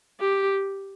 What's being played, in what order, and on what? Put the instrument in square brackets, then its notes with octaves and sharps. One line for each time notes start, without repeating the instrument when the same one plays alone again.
[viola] G4